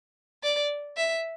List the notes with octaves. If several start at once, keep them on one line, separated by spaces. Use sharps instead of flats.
D5
E5